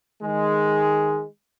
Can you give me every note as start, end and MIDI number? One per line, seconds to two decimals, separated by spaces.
0.21 1.24 51
0.21 1.24 56